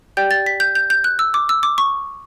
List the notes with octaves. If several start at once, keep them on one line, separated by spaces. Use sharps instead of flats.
G4 D5 G5 G6
A6
B6
G6
G6
G6
F#6
E6
D6
E6
D6
C#6